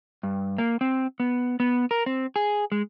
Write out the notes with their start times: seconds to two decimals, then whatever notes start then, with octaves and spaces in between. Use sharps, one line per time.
0.23 G2
0.58 A#3
0.81 C4
1.20 B3
1.60 B3
1.91 A#4
2.06 C4
2.36 G#4
2.72 G#3